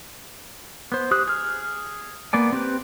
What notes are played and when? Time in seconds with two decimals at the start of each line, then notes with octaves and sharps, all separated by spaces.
0.92 B3 C5
1.11 G4 C5 D#6 F#6
1.28 G#4 F6
2.33 A#3 B3 D5 G#5
2.53 C4 G4 B4